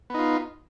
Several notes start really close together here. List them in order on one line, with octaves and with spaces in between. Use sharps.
B3 D#4 F4